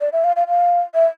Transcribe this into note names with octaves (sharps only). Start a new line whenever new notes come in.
D5
E5
F5
F5
F5
E5